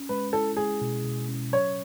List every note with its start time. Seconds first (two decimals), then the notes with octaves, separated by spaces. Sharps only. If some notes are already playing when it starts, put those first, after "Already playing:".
Already playing: C#4
0.09 G#3 B4
0.33 E4 A4
0.57 G#3 G#4
0.81 B2
1.05 B2
1.29 C#4
1.52 F#3 C#5